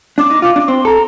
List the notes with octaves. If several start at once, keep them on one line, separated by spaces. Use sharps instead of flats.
D4 D6
D#4
F4 D6
D4 D6
C4 C6
A4 A#5